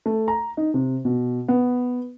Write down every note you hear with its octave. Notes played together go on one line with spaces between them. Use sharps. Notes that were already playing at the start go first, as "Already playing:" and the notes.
A3
A#5
D#4
C3
B2
B3